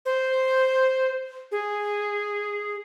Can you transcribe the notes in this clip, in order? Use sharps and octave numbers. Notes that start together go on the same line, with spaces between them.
C5
G#4